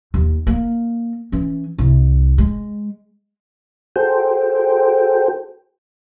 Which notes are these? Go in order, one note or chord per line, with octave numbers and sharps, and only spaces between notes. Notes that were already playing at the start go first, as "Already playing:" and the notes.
D#2
A#3
E3 C#4
C2
G#3
F#4 G#4 A4 C5 G5